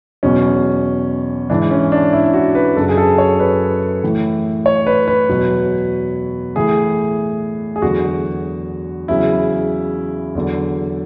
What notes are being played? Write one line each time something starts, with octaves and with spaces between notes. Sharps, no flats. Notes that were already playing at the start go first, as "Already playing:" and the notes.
E2 B2 F#3 C#4
G#2 E3 D4
C#4
D4
E4
F#4
B4
F#2 C#3 F#3 A4
G#4
A4
C#5
B4
A2 E3
C#5
B4
B4
E2 B2 F#3
A2 E3 G#4
G#4
E2 D3 F#3 F#4
E2 C#3 F#3 E4
E2 D3 F#3